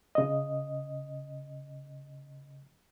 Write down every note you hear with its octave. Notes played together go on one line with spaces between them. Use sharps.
C#3 D#5